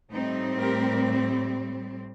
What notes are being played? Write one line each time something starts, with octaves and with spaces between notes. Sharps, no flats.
A2 G3 C4 D#4
G4 A#4